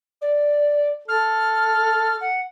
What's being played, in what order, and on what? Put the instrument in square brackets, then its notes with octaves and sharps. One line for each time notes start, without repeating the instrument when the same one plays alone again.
[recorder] D5
[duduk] A4 [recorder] F6
[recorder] F#5